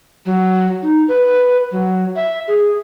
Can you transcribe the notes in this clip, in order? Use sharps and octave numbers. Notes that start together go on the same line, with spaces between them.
F#3
D#4
B4
F#3
E5
G#4